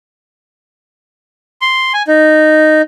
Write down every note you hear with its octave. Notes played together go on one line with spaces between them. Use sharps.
C6
G#5
D#4